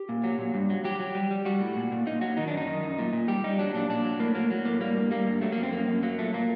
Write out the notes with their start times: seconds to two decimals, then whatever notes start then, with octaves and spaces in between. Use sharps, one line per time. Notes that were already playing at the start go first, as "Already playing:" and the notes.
Already playing: G4
0.09 A#2
0.24 F#3
0.38 A#2
0.54 G2
0.70 F#3
0.84 F#3 G4
1.00 F#3
1.15 G3
1.31 G3
1.45 G3 F#4
1.61 A2
1.76 A#2
1.92 A#2
2.06 A#2 D#4
2.21 F#3 F#4
2.37 D#3 D#4
2.48 D4
2.52 F#2
2.57 D#4
2.67 D#3
2.83 F#2
2.99 A#2
3.13 A#2
3.28 G3 G4
3.44 G3 D#4
3.59 F#3 D4
3.74 A#2 D4
3.89 A#2 D4
4.05 F#3
4.19 A2 A#3
4.35 F#3 A#3
4.51 F#3
4.65 A2 A#3
4.81 G3 A#3
4.96 G2
5.11 G3 A#3
5.27 G2
5.41 F#3 A3
5.52 A#3
5.57 F#2
5.63 C4
5.72 F#2 A#3
5.88 F#2
6.03 F#3 A#3
6.18 A#2 A3
6.33 A#2 A#3